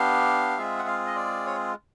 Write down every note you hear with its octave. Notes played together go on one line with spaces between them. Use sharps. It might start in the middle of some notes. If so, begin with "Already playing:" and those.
Already playing: B3 D4 G4 F5
G#3 C4 F4 G#4 E5
F#5
F5
D#5
D5
C#5